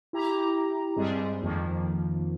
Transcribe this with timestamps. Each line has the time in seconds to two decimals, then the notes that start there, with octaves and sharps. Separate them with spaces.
0.13 E4 G4 A#5
0.96 G2 G3 G#3 C4 G#4
1.42 F2 D#3 F3 A#3